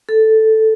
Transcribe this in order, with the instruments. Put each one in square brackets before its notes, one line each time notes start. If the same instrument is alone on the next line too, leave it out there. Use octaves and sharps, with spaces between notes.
[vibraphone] A4